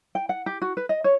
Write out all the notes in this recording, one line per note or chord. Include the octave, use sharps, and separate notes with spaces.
G5
F#5
G4
F#4
B4
D#5
C#5